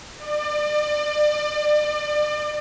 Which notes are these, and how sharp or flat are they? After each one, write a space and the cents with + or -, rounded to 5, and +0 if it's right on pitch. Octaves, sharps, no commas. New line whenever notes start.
D5 +35